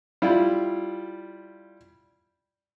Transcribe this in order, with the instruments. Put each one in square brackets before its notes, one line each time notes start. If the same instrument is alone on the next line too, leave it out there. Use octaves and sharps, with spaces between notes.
[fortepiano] G3 E4 F4